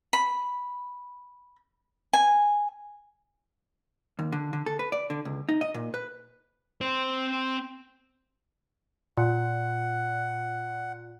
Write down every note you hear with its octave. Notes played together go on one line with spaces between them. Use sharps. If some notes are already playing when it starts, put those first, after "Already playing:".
B5
G#5
D#2
D3
D3
A4
B4
D5
D3
C#2
D#4
D#5
A#2
B4
C4 C5
A#2 F#5